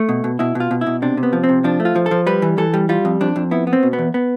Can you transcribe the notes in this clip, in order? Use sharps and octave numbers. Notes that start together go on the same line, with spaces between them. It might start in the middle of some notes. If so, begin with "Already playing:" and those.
Already playing: A3
B2
B2
B2 E4
B2
F4
B2
E4
B2
C3 D4
C3
B3
F3
C4
C3
F3 D4
A3
F4
F3
A4
F3
G3 B4
E3
E3 A4
G3
G3 F4
F2
F2 D4
F2
B3 E4
B3
C4
B2
B3
E2
B3